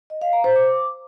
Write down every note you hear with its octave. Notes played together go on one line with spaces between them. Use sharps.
D#5
F5
A#5
C5
D6